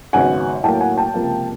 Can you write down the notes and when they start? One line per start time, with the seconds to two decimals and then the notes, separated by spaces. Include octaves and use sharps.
0.13 G#1 F#2 C#3 F#3 B3 F#5 G#5
0.63 A2 F#3 A#3 G5 A5
0.81 F#5 G#5
0.97 G5 A5
1.14 C#2 C3 F3 A#3